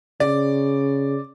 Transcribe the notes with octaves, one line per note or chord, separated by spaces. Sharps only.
C#3 D5